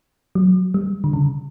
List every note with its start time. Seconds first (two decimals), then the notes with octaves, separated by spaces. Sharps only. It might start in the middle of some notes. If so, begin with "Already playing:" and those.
0.35 F#3
0.74 G3
1.04 D3
1.13 C#3